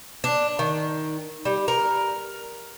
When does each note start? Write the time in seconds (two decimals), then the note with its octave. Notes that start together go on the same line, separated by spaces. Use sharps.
0.24 D4
0.59 D#3
1.45 G3
1.68 A#4